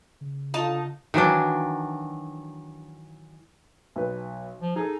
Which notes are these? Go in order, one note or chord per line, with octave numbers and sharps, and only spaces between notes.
C#3
D3 D#4 F4 A5
D#3 E3 F#3 D4
B1 B4
F3
D#4 G#4 A4